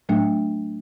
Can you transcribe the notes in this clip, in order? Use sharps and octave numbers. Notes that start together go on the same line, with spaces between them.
A2 F#3 A3 D4